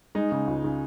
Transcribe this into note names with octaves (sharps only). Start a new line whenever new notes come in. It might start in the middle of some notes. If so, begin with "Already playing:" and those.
G#3 D#4
C#3
C#2
C#3